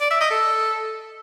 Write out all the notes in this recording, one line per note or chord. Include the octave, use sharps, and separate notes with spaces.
D5
E5
D#5
A4